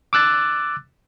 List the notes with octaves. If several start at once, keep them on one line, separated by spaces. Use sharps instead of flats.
D6 E6 F#6 A6